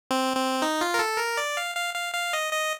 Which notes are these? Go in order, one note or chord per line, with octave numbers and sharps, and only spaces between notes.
C4
C4
D#4
F4
A#4
A4
A#4
D5
F5
F5
F5
F5
D#5
D#5